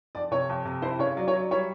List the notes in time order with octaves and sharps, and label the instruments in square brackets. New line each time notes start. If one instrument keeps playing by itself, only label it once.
[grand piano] F2 [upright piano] D5
[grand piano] C3 [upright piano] C#5
[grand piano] F2
C3
[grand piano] E4 [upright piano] C5
[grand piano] C#3 [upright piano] C#5
[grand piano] F#3 [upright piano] D5
[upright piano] C#5
[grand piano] F#3
[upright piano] D5
[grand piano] G3 [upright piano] C#5